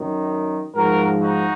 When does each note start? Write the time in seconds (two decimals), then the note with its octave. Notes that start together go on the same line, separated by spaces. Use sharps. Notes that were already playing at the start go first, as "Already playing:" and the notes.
Already playing: F#2 D#3
0.75 G#2 F3 F#4 A#4
1.20 D#4 F#4